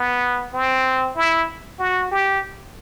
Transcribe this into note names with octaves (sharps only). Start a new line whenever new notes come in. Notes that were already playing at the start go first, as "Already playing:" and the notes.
Already playing: B3
C4
E4
F#4
G4